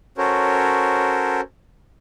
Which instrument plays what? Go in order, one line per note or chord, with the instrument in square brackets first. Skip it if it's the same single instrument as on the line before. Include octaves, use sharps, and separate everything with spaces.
[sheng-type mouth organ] C#4 F#4 A4 A#4 C5 C#5